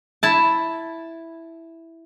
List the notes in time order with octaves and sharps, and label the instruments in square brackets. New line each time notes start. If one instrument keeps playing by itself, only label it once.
[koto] E4 A5